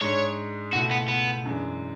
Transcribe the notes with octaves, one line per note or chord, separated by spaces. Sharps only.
G#2 G#3 D4 G#4 C#5
C#2 B2 A3 E4 F#4
B3
B3
F#2 E3 G#3 D4